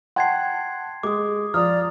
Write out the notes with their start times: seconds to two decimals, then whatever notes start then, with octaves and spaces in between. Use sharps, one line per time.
0.16 F#5 G5 A5 C6 G#6 C7
1.03 G#3 D6 D#6
1.54 F3 D5 A#5 D#6 F6